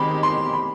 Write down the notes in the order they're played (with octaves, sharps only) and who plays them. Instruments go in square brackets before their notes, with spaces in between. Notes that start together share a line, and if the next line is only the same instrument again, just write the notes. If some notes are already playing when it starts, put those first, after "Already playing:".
Already playing: [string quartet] D#3 G#3 C4 G4 [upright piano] B5
[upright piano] C6
B5